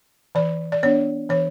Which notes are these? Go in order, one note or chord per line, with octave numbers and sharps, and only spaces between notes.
E3 D5
D5
B3 D4 C#5
E3 C#5